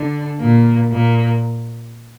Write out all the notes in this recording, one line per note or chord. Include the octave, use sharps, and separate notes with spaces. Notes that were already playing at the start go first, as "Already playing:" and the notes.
Already playing: D3 D4
A#2 A#3
A#2 A#3